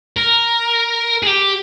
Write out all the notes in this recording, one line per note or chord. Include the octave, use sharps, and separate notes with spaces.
A#4
G#4
G4